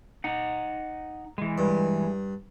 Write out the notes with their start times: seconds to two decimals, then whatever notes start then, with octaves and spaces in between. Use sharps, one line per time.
0.24 D#4 F#5
1.38 E3 G#3
1.58 G2